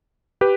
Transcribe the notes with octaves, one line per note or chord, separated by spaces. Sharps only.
G4 B4